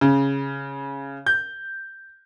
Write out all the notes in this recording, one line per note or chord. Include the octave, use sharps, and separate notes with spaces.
C#3
G6